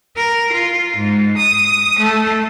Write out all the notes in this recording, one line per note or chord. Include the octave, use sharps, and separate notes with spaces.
A#4
F4
G#2
D#6
A3